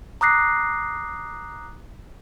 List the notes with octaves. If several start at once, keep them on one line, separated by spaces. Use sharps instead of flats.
A#5 D6 D#6 F#6 A#6 C7